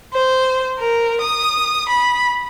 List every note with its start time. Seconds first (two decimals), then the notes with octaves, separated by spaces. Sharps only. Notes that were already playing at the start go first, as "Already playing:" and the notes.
0.12 C5
0.78 A#4
1.20 D#6
1.89 B5